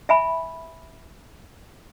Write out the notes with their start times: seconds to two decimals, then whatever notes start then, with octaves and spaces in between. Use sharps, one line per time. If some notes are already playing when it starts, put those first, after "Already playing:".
0.09 E5 G#5 B5